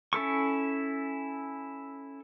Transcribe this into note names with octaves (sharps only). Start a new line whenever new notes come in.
C#4 E4 A4 C#6